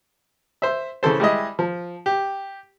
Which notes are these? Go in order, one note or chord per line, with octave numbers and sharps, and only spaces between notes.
C5 E5
C#3 E3 A4 C5
G3 G#3 E4 D#5
F3
G4